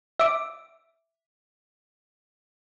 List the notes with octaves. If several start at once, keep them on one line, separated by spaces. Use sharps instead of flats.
E5 D6